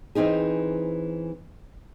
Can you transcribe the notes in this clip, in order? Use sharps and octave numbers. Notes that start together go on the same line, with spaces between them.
E3 C4 D#4 G#4